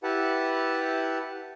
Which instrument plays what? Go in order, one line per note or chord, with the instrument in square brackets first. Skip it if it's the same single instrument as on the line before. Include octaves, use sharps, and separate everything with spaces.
[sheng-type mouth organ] E4 G4 B4 E5 F#5 A5